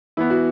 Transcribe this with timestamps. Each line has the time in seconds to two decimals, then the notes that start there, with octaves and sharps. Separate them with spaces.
0.17 E3 B3 E4
0.30 F#4